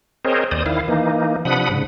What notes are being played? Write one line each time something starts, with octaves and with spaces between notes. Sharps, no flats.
C4 G#4 A#4 C5 C#5 D#5
D#2 C5 D5 D#6
D#3 E4 F5
E3 A#3 D#4
C3 F3 D4 F#5 B5 D#6
G#2 C#3